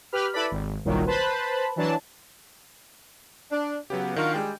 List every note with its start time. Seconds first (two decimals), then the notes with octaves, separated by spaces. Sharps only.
0.12 G4 B4 B5 F6
0.33 E4 A4 B4 D5 B5
0.51 G#1
0.85 G1 C2 A#2 D#3 F#3
1.06 B4 C5 A5 B5
1.76 E3 F#3 D4 A5
3.51 D4
3.90 C#3 F#3 B3 G4
4.16 D#3 D4 F4 F#4 A#4 F5
4.34 G3 G#3 G5